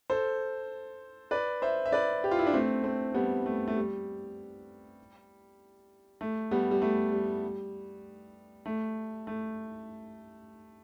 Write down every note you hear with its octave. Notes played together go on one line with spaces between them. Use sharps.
A4 C5
B4 D5
C5 E5
E5
B4 D5
G4
F4
E4
D4
A3 C4
A3 C4
G3 B3
A3
A3
G3
A3
G3 B3
G3
A3
G3
A3
A3